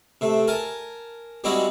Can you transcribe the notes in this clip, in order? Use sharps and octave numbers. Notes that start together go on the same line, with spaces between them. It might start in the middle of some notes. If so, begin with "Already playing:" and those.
C3 A3
A#4 G#5 A5
G3 G#3 C4 D#4 E4 F#4